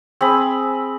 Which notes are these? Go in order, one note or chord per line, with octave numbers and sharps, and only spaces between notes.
C4 G#4 B5